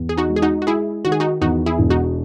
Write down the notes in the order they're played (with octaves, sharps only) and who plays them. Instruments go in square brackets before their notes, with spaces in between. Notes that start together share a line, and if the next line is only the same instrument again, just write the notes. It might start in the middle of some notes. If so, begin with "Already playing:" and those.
Already playing: [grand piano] E2
[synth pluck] G#4
D#4 F#4
[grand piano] G#3
[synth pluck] G#4
D#4 F#4
F#4
[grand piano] G#3 [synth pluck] E4 G#4
[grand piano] D#3 [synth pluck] F#4
[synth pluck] G#4
D#4 F#4
[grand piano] E2 [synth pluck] D#4 F#4
[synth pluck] E4 G#4
[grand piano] E1
[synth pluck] D#4 F#4